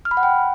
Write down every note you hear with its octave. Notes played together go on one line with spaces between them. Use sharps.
F6
B5
F#5
G5